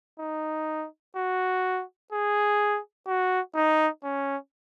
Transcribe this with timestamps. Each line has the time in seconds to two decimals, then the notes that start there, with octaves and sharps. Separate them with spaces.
0.19 D#4
1.16 F#4
2.12 G#4
3.07 F#4
3.55 D#4
4.03 C#4